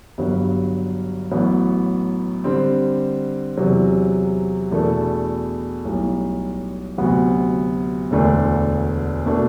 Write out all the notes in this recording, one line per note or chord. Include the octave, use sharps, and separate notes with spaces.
G1 G2 F#3
A1 A2 F#3 B3
D3 G3 C4
E2 C3 F#3
E2 B2 A3 D4 A4
B1 A2 G3
D2 C3 F#3 B3 F#4
E1 D2 D3 A3 D4
B2 A3 D4